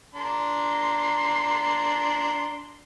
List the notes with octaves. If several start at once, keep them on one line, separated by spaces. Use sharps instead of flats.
D4 A#5 C6